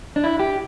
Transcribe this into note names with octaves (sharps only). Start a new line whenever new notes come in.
D4
E4
G4